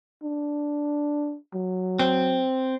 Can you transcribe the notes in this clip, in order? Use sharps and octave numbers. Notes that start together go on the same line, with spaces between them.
D4
F#3
C4